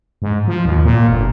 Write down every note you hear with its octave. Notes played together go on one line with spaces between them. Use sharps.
G#2
F3
D#2
A#2
G1